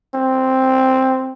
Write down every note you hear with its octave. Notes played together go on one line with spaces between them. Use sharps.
C4